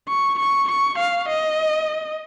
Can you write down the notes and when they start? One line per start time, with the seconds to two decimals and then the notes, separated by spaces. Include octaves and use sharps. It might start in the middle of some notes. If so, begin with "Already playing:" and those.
0.09 C#6
0.39 C#6
0.69 C#6
0.99 F5
1.29 D#5